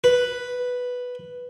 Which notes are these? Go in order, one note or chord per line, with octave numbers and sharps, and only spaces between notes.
B4